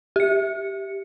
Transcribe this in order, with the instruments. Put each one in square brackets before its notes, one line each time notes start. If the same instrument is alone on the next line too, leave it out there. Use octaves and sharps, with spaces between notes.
[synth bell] G4 C#7